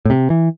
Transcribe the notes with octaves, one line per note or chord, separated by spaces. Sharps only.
A2
C3
E3